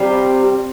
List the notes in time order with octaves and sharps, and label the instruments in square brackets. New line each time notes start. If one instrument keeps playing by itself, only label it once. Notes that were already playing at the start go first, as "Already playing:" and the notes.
Already playing: [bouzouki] C3 G3 C4 F4